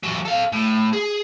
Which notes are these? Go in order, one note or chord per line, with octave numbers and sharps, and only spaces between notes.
E3 F#3
A4 F5
A2
G#4